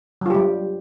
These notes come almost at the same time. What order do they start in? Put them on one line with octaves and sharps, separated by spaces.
F#3 F4 G4 G3